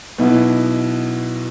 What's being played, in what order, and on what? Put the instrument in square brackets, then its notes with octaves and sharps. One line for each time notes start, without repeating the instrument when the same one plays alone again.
[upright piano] B1 B2 B3 E4